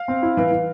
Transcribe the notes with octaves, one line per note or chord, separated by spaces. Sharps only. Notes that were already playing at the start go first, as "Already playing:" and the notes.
Already playing: F5
C4
E4
E3
E3